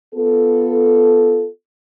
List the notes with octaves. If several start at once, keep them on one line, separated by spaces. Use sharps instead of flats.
B3 F4 A4